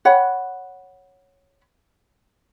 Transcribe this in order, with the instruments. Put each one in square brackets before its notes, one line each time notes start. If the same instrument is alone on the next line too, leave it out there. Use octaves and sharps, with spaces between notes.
[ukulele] C#5 F#5 B5